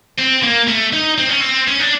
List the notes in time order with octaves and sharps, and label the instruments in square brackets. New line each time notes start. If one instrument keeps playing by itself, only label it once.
[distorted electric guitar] C4
A#3
A3
D#4
C4
C#4
C4
C#4
D4